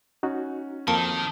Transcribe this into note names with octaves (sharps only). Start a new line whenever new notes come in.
C#4 D#4 F#4
F2 D#3 A#3 A5